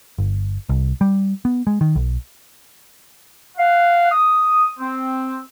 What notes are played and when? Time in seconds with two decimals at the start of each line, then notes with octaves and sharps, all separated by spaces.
0.18 G1
0.69 C2
1.01 G3
1.45 B3
1.67 G#3
1.81 D#3
1.96 B1
3.57 F5 F#5
4.11 D#6
4.79 C4